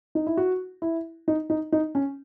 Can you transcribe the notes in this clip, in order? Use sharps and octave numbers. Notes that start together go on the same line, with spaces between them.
D#4
E4
F#4
E4
D#4
D#4
D#4
C#4